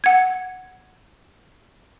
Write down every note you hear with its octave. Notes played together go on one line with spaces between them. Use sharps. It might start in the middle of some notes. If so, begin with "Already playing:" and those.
F#5 G#6